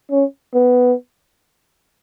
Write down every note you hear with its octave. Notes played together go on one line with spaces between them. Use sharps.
C#4
B3